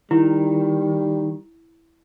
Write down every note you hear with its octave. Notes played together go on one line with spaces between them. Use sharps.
D#3 G3 E4